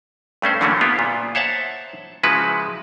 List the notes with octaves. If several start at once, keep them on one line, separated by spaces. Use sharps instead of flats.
G2 A3 C#4 C5
D3 E3 F#3 A3 A#3 C#4
B3 E4 F4 G4
A#2
C5 C#5 E5 F#5 A5
C#3 F3 G#3 E4 F#4 B4